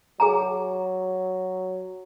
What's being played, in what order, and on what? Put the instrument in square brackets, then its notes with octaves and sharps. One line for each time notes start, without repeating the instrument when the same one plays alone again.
[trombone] F#3 [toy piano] G#4 G#5 A#5